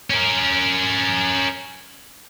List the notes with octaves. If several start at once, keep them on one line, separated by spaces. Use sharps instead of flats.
C#4 A#4